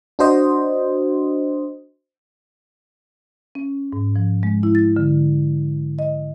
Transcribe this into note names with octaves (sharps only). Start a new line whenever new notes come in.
D4 F#4 C5 D#5
C#4
G#2
F3
G#3
E4
A6
D3
D#5